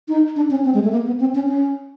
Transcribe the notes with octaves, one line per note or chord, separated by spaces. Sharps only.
D#4
D4
C#4
C4
G#3
A3
A#3
B3
C4
C#4
C#4